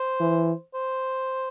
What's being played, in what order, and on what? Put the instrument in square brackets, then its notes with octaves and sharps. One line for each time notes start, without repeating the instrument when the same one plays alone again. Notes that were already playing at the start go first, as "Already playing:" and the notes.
Already playing: [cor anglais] C5
[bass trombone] E3
[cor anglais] C5